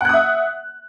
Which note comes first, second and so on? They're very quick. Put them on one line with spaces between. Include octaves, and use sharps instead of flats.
F#5 F#6 D#6 E5